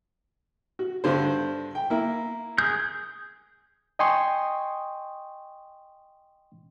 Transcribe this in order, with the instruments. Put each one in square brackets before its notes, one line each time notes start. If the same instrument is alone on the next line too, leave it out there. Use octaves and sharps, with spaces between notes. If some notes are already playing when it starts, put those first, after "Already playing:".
[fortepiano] F#4
G2 D3 C5
G5
A#3 E4
[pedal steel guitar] G#4 G6
[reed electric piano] D#5 G5 G#5 C6 C#6 D#6